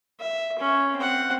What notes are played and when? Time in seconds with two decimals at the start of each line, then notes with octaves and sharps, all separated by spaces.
0.19 E5
0.58 C#4
0.96 C4 F#5